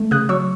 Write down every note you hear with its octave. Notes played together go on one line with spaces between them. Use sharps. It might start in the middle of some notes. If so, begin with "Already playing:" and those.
Already playing: A3
C#3 D#6 F#6
F#3 C#6 E6